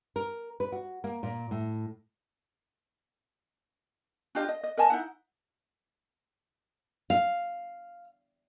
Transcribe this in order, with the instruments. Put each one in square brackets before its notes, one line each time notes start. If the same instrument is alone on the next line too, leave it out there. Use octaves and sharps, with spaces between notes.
[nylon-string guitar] A#4
B4
F#4
A#3
A#2
A2
[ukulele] D4 F4 G4 D#5
D#5
D#5
A#4 D#5 G#5 A5
D#4 E4 F#5
[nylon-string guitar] F5